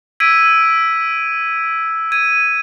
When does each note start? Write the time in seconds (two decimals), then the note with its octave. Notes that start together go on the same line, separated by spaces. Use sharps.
0.20 E6 G#6 B6 D7 D#7
2.12 G#6 D#7